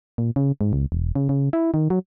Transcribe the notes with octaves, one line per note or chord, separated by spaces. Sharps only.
A#2
C#3
G#2
C#2
E1
C#3
C#3
E4
D#3
F#3